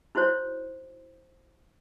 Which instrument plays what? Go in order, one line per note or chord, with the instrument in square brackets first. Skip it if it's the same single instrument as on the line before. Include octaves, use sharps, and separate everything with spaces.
[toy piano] D#4 E4 F#4 C5 C#5